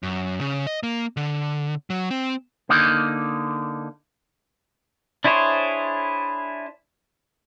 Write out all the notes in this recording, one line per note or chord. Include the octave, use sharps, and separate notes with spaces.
F#2
C#3
D#5
A#3
D3
F#3
C4
D3 A#3 D#4
D4 E4 G#4 C5 C#5